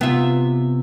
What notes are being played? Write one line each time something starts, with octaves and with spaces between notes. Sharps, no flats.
C3 B3 F4 E5